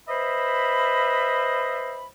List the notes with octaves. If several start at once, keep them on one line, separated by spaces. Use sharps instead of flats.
B4 C5 D#5 E5 B5